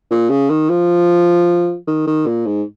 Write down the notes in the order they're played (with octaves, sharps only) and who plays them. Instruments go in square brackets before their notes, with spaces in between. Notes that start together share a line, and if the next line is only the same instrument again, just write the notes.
[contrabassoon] A#2
C#3
D#3
F3
D#3
D#3
A#2
G#2